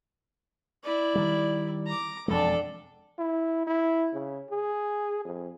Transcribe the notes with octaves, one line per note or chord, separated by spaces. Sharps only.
E4 D5
D#3 G3
A#5 D6
E1 F2 G#3 D4 A4
E4
E4
C#3
G#4
F2